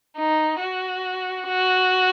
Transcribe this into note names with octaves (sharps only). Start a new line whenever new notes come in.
D#4
F#4
F#4